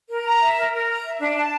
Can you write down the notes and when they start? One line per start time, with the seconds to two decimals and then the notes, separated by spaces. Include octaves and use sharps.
0.09 A#4
0.25 A#5
0.41 E5
0.57 A#4
0.73 A#4
0.89 A#5
1.05 E5
1.20 D4
1.36 A5